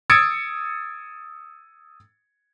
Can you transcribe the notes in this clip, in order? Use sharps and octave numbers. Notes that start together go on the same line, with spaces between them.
D#6 E6 G#6 A6 C#7 D7